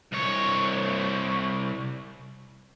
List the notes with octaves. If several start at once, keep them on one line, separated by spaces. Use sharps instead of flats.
C2 C#5